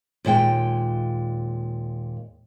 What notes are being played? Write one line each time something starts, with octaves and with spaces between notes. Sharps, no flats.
D#2 A#2 G#3 G5